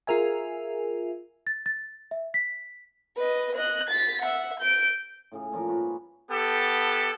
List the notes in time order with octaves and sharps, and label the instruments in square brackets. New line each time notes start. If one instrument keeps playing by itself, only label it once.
[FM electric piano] F4 G#4 A#4 E5 G#5
[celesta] A6
A6
E5
B6
[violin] B4 D#5
D#5 F#6
A6 B6
E5 F#5
G6 D7
[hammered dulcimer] A2 C#3 G#4
A#2 F3 A#4 D6
G#2 F4 F#4 B4
[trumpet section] B3 G4 A4